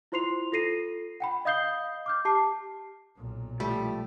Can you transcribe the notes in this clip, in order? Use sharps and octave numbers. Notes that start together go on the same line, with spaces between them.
E4 F4 C5 C6 C7 F7
F4 A4 A#6 C7 D#7
F#5 G5 B5
D#5 F5 D#6 G6 C7 G7
D6 F6 G6
G4 A5 D6 C7
B1 A#2
F3 G3 A3